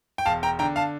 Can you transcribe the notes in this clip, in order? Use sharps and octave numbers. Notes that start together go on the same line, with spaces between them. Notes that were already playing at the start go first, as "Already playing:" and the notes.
G5
E1 F5 A5
G5 A#5
D3 G5 A#5
F5 A5